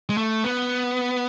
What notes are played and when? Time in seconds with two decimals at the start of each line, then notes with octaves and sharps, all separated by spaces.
0.09 G#3
0.17 A3
0.44 B3